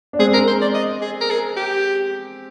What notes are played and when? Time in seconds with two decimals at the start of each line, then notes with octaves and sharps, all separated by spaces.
0.13 D4
0.19 G#3 C4 G#4
0.33 A#4
0.47 C5
0.61 D5
0.74 D#5
1.01 G#4
1.21 A#4
1.30 G#4
1.56 G4